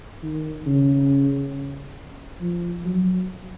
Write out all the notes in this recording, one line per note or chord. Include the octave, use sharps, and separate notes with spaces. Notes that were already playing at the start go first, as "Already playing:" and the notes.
D#3
C#3
F3
F#3